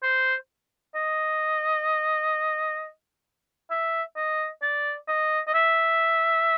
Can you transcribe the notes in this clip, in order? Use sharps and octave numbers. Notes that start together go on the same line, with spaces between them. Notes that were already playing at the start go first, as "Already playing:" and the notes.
C5
D#5
E5
D#5
D5
D#5
D#5
E5